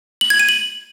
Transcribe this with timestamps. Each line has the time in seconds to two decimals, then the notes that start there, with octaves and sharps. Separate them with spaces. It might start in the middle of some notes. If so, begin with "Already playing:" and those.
0.21 F#7
0.30 G#6
0.39 D#7
0.49 F#7